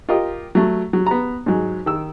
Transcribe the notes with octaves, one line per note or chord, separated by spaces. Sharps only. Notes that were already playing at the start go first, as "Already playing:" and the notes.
F4 G4 A#4 D#5
F#3 A3
F#3
B3 A#5
G#2 F#3 G#3
D#3 E6